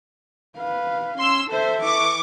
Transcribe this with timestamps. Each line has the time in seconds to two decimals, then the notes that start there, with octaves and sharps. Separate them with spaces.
0.58 B4 F5
1.18 C#4 C6 E6
1.51 A4 C5 E5
1.81 E3 C#6 D6